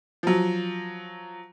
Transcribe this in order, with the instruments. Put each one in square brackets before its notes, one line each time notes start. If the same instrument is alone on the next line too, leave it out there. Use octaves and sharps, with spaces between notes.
[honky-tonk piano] F3 F#3